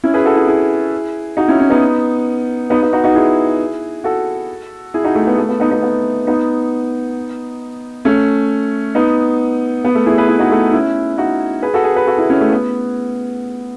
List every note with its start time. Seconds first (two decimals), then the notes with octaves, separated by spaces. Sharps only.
0.04 C#4 E4
0.14 G#4 B4
0.25 F#4 A4
0.36 E4 G#4
0.47 E4 G#4
1.37 D#4 F#4
1.48 C#4 E4
1.59 C#4 E4
1.70 B3 D#4
2.70 B3 D#4
2.82 B3
2.93 D#4 F#4
3.04 D#4 F#4
3.15 E4 G#4
4.04 F#4 A4
4.94 E4 G#4
5.04 D#4 F#4
5.15 A3
5.27 B3
5.38 A3
5.49 B3
5.60 B3 D#4
5.71 B3 D#4
5.83 B3
6.27 B3 D#4
8.05 A3 C#4
8.95 B3 D#4
9.84 B3
9.95 A3
10.06 E4 G#4
10.18 G#4 B4
10.28 E4 G#4
10.39 D#4 F#4
10.51 A3
10.73 C#4 E4
11.18 D#4 F#4
11.62 G#4 B4
11.74 F#4 A4
11.84 G#4 B4
11.95 G#4 B4
12.07 F#4 A4
12.17 E4 G#4
12.30 C#4 E4
12.41 A3
12.52 B3